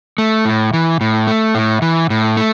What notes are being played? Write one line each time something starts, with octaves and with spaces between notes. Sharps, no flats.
A3
A2
E3
A2
A3
A2
E3
A2
A3